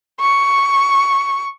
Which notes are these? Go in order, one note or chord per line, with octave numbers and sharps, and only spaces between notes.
C#6